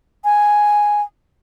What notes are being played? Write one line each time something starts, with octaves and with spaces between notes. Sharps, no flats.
G#5